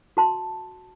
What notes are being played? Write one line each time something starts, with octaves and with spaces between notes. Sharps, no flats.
F#4 A5 C6